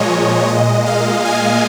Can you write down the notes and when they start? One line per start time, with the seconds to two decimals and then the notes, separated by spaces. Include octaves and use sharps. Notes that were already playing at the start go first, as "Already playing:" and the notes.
Already playing: A#2 F3 G#3 C#5 D#5
0.48 A#2 G#3 D#5
0.86 F5
1.25 G#5